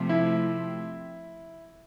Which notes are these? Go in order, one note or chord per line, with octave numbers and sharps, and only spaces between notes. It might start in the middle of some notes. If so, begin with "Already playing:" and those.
Already playing: C3 F3 A3 C4
E4